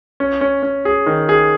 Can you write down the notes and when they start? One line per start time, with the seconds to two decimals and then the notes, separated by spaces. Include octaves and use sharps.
0.20 C#4
0.41 C#4
0.63 C#4
0.85 G#4
1.06 D#3
1.29 G#4